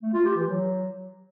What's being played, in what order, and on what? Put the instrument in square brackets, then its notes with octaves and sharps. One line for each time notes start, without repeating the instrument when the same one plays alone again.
[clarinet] A3
F4
G4
E3
F#3